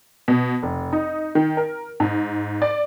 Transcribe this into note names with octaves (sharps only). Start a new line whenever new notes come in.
B2
F1
D#4
D#3
A#4
G#2
D5